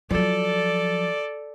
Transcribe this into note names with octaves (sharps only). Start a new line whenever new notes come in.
F3 F#3 A4 D5